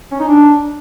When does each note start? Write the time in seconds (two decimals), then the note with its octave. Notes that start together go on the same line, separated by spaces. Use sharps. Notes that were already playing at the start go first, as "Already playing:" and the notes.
0.12 C#4
0.20 D#4
0.28 D4